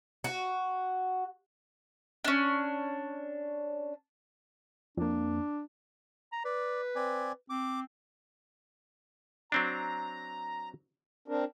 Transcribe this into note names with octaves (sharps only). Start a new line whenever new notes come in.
F#4
C#4 D4
F2 A#3 D4
A#5
B4 D5
C4 D5 G#5
C4 D6
F#3 C4 D4 A#5
C4 D4 A#4